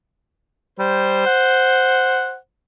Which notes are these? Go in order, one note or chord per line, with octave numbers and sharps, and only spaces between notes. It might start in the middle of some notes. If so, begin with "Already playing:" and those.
G3 C5
F#5